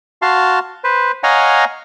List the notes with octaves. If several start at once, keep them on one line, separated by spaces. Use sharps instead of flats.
F#4 F5 A5 C6
B4 C5
C#5 D#5 F5 F#5 G#5 A#5